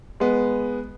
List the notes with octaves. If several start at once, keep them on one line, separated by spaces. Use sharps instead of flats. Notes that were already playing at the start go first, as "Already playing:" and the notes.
G#3 B3